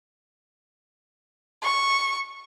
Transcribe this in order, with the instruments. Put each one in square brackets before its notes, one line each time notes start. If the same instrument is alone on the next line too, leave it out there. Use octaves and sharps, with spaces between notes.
[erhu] C#6